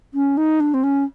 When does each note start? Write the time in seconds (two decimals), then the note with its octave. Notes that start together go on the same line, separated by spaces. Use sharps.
0.14 C#4
0.37 D#4
0.60 D4
0.74 C4
0.83 C#4